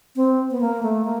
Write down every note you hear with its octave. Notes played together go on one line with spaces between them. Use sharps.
C4
B3
A#3
A3
A#3